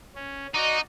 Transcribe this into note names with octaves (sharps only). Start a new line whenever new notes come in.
C#4
D#4 F#4 D5 D#5